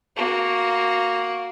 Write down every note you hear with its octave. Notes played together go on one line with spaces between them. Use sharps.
A#3 F#4